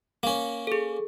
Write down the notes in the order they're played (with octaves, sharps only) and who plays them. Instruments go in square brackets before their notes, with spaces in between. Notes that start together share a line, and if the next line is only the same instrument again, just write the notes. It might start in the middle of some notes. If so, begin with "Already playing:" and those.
[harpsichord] A#3 C#4
[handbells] G#4 A4